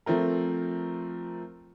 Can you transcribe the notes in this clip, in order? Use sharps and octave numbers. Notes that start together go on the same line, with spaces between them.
F3 A3 C4 A#4